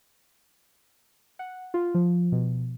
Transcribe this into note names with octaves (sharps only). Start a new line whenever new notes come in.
F#5
F4
F3
B2